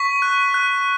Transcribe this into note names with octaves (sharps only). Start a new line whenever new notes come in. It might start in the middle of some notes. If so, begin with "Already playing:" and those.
Already playing: C#6 B6
F#6
F#6